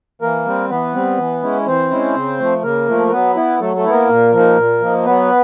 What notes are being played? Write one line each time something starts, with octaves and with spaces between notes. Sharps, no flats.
E3 A#3 A#4
G3 C4
E3 B3 B4
G3 C4
E3
G#3 C#4 E4
E3 C4 C5
G#3 C#4 E4
C#3
F3 A3
C#3 A#3 A#4
F3 A3
A#4
F#3 B3 B4
B3 E4
F#3 A3 A4
A3 A4
B3 E4
A#3 A#4
A#2
F3 A#3 D#4
A#2
F3 A#3 D#4
F#3 B3 B4